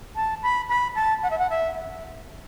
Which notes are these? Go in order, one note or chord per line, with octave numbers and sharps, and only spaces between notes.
A5
B5
B5
A5
F#5
E5
F#5
E5